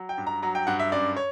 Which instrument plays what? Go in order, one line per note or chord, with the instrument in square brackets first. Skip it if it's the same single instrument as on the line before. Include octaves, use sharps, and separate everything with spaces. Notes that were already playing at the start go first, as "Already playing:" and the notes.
Already playing: [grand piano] F#3
G5
G2
A#5
F#3 A#5
G5
G2 F#5
E5
F#2 D5
C#5